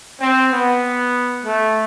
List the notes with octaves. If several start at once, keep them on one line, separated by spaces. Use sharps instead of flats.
C4
B3
A3